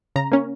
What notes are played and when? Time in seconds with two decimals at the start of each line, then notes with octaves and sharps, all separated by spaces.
0.16 C#3 A#5
0.32 A#3 C#4